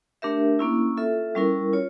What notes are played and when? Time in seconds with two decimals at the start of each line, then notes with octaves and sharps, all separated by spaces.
0.22 A3 D4 G4 A#4 E5
0.59 A#3 C#4 E4
0.97 F4 A4 E5
1.35 G3 C#4 E4 A#4
1.73 F4 C#5